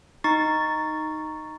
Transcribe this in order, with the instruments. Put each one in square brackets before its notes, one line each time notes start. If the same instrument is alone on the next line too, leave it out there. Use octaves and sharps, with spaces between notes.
[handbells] D#4 C#6 A6